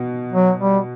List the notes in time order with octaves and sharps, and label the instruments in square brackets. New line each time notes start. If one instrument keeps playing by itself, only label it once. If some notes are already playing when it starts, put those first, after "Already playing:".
Already playing: [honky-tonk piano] B2
[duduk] F#3
G3